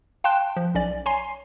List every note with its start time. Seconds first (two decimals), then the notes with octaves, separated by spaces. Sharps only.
0.24 F5 G5 A5 C6 F#6
0.56 F3
0.75 B1 C#4 D5
1.06 C#5 G#5 A#5 C6 C7